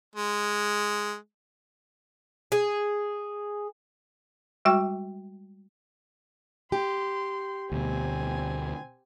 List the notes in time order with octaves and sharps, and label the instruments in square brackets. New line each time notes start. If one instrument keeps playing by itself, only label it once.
[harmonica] G#3
[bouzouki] G#4
[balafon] G3 G#3 F#4 G5 C#6
[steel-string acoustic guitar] G4 [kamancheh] C6
[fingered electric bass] D2 B2 [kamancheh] C4 G#5